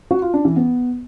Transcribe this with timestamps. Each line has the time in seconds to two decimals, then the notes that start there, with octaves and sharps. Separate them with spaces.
0.11 F#4
0.22 F4
0.33 D4
0.45 E3
0.56 B3